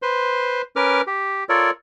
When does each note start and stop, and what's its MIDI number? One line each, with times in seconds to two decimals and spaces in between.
0.02 0.62 71
0.02 0.62 72
0.02 0.62 84
0.76 1.01 61
0.76 1.01 70
0.76 1.01 71
0.76 1.01 86
0.76 1.01 89
1.07 1.44 67
1.49 1.70 65
1.49 1.70 69
1.49 1.70 70
1.49 1.70 73
1.49 1.70 74